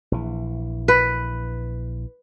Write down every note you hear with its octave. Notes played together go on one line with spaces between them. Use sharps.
A#1 E3
B4